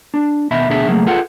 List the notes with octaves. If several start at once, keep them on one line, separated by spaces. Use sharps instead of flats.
D4
D#2 B2 D#5 E5 B5
D2 B2 D4 G#4 A#4 E5
C#3 F#3 A3 A#3 G#4
F4 G#4 A4 B4 F#5